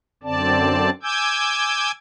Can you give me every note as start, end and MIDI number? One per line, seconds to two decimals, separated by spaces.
0.23 0.90 42
0.23 0.90 50
0.23 0.90 60
0.23 0.90 74
0.23 0.90 81
1.03 1.91 80
1.03 1.91 86
1.03 1.91 88
1.03 1.91 91
1.03 1.91 92